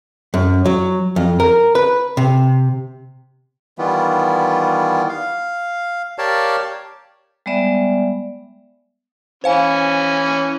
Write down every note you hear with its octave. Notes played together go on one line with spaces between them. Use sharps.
F#2
F#3
F2
A#4
B4
C3
D#3 E3 G3 B3 F4
F5
G4 A#4 C#5 D5 F5 A5
G3 G#3 B3 D5 E5
E3 C#4 C5 F5 G#5